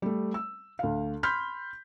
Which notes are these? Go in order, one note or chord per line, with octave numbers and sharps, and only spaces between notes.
G3 A3
E6
D2 F5
B5 C6 F6 G6 B6